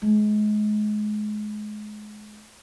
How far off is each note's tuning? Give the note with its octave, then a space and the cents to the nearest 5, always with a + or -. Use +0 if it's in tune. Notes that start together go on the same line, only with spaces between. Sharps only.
G#3 +30